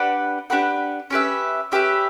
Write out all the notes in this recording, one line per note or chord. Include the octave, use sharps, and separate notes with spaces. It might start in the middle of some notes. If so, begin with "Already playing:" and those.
Already playing: D4 G4 B4 F#5
D4 G4 B4 F#5
C#4 G4 B4 E5
C#4 G4 B4 E5